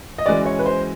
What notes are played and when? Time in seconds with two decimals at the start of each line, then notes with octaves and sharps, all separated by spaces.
0.18 D#5
0.26 E3 G#3 C#4 F#4 D5
0.46 C#5
0.59 B4
0.66 C5